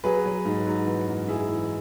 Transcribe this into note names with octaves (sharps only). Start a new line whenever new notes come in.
F#3 G#4 B4
F#3
G#2
F#3
E3
F#2
E3 E4 G#4
E3